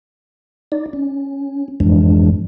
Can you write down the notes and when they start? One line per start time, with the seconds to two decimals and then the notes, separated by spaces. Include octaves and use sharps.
0.72 D#4 D5
0.93 C#4
1.80 F2 G#2 E3 F3 G#3 D4